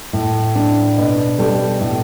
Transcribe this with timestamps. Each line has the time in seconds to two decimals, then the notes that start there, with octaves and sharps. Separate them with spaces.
0.13 A2
0.55 D4
0.97 B2
1.38 G3 A4
1.81 A2